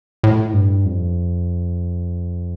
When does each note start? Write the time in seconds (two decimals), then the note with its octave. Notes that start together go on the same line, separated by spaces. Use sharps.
0.24 A2
0.53 G2
0.85 F2